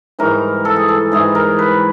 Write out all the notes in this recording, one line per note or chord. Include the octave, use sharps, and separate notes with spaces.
G#2 E3 G3 A#4
A4
G#4
A4
G#2 E3 G3 G#4
A#4
B4